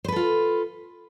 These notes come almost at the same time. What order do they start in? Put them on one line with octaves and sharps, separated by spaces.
C5 B4 A4 F4